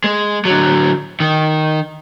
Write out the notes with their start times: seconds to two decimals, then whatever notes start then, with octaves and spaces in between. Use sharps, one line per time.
0.04 G#3
0.45 D3 F#3
1.20 D#3